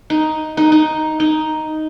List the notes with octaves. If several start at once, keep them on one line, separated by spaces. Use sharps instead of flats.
D#4
D#4
D#4
D#4